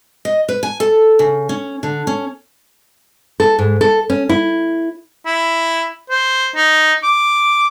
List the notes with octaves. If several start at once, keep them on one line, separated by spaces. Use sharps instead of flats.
D#5
B4
G#5
A4
C#3
C#4
D3
C#4
A4
G#2
A4
C#4
E4
E4
C5
D#4
D6